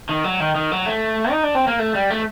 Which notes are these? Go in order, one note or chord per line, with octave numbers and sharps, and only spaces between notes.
D#3
F#3
D#3
D#3
F#3
A3
D#4
D4
C4
A#3
A3
G3
A3